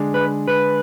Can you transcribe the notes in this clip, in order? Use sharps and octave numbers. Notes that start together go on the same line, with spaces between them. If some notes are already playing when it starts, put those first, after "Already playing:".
Already playing: D3 G#3 D4
B4
B4